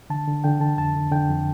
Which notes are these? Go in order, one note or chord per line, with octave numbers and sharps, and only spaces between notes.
D3 A5
D3
D3 G5
D3 A5
F2 A5
D3
D3 G5
F2